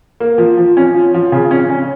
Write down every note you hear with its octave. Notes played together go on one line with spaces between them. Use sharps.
A#3
F3
F3
C#4
F3
F3
C#3
C#4
C#4